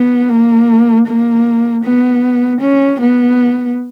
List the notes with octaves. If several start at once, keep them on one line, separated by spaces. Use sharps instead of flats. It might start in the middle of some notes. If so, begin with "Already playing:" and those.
Already playing: B3
A#3
A#3
B3
C#4
B3